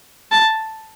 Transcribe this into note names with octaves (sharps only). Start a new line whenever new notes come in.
A5